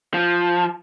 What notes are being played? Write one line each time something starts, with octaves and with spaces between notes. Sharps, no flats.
F3